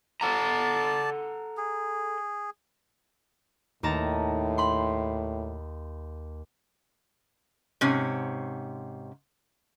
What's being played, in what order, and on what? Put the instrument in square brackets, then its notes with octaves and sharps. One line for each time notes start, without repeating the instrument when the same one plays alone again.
[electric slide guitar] A4 F#5 A#5 [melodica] D5 A5
[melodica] G#4
[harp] D#2 A5 A#5 [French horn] A2
[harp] B5 C6
[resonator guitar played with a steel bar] G#2 C3 C#4